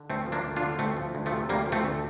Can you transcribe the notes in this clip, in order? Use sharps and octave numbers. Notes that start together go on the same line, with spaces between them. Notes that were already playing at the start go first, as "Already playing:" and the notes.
Already playing: D3
D2 A3 C4
F3
A#3 D4
D2
D4 F4
D3
D2 A3 C4
F3
D2
F3 A3
C3
D2 G3 A#3
F3
A3 C4
D2